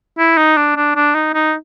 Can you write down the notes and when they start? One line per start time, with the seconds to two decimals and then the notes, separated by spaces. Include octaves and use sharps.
0.18 E4
0.38 D#4
0.57 D4
0.76 D4
0.96 D4
1.15 D#4
1.34 D#4